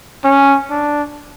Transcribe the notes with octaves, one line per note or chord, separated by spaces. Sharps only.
C#4
D4